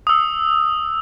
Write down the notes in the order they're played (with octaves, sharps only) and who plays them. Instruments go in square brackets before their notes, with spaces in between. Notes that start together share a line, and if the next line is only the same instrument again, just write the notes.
[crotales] D#6 E6